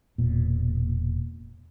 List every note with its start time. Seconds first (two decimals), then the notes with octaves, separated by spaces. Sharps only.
0.18 E1 A#2